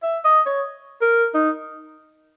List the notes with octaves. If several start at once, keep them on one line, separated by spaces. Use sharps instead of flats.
E5
D#5
C#5
A#4
D#4